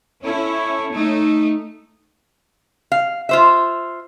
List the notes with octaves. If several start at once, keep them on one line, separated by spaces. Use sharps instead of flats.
C#4 E4 A4 C#5
A3 D#4
F5
F4 C5 E5